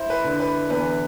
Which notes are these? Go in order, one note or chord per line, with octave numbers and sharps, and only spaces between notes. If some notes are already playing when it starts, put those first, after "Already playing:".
Already playing: E4 C5
B4
D3
B4
E2 B4